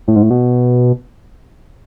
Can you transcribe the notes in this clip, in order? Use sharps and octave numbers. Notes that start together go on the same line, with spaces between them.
A2
G#2
A2
B2